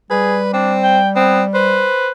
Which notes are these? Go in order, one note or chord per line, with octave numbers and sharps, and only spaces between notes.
G3 G#4 B4
C4 D4
G5
B3 C4
B4 C5